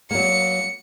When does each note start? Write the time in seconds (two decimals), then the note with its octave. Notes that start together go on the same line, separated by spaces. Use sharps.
0.11 F#3 A#3 C#7